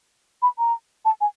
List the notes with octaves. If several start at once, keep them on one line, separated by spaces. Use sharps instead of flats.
B5
A#5
A5
G#5